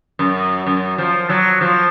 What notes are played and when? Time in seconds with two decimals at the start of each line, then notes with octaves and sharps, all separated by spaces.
0.19 F#2
0.66 F#2
0.98 F3
1.29 F#3
1.61 F3